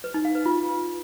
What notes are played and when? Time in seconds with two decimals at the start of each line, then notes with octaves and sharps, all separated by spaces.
0.04 B4
0.14 D#4
0.25 F5
0.35 B4
0.46 F4